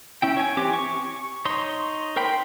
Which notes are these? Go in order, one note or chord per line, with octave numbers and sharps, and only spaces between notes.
C#4 E4 G5
C#5 G#5
E3 C4 G4 D6
C#6
D#4 C#5 C6
A#4 C5 G5 B5 C6